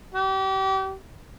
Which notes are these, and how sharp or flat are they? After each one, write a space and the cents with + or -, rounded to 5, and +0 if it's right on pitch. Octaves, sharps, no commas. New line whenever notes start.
G4 -35